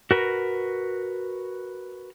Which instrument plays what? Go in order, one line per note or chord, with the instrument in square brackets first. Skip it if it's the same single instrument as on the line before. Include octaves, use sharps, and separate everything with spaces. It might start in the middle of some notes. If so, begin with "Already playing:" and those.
[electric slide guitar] F#4 A#4 B4